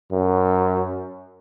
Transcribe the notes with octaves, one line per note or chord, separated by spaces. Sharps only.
F#2